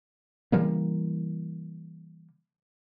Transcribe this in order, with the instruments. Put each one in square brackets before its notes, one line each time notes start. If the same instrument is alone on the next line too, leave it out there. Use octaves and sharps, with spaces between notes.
[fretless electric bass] C#3 E3 G3 A#3